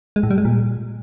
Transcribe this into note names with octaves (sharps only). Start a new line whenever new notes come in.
G#3
A2
G3
G#3
A#2